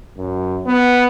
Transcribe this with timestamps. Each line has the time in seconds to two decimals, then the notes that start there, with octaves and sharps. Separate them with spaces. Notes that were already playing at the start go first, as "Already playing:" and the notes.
0.17 F#2
0.66 B3